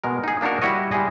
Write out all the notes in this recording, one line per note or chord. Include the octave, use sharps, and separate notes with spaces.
B2 G#3 A#4
D#4 G#4
A#3 D4 D#4 F#4 A#4
G3 E4 F#4 C#5 D#5
G3 G#3 E4 G#4 D#5